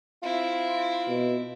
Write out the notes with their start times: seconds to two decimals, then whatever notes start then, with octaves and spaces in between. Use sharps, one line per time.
0.23 C4 E4 F4
1.07 B2